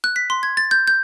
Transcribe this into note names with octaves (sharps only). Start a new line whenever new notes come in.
F#6
B6
C6
G#6
A6
G6
G6